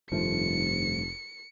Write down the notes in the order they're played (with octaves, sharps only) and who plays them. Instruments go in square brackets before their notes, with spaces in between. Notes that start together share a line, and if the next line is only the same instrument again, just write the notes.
[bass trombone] F1 [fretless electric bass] G2 D#3 A3 [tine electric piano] F3 [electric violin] C#7